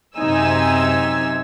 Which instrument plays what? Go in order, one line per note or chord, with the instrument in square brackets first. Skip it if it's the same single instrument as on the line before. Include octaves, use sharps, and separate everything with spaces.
[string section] F#2 C3 C4 D#4 G#5 E6